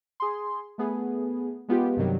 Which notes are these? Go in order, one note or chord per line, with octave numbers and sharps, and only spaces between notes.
G#4 C6
A3 B3 G#4
G#3 B3 F4 G4
G2 C3 D#3 F#3 G3